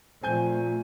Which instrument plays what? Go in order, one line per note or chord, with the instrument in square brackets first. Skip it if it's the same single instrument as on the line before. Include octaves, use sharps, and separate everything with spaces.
[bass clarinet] A#2 [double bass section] F3 A3 [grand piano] C4 G#5 G6